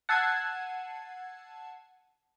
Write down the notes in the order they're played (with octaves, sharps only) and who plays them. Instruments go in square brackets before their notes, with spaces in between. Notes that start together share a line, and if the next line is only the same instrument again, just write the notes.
[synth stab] F#5 A5 E6 G#6 C7 D#7